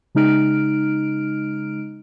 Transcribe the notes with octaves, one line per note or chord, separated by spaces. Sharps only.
C#3 G#3 D#4 F6 D7